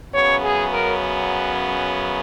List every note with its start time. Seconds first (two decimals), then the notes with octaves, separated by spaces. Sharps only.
0.14 F#2 C#3 F#3 B3 C#5
0.43 G#4
0.72 A#4